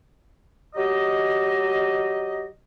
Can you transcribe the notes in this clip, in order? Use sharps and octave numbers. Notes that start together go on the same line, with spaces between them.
F#3 G4 D#5